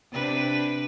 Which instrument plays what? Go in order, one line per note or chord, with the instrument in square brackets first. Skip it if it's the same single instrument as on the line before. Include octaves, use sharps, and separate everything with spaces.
[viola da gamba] C3 D4 B4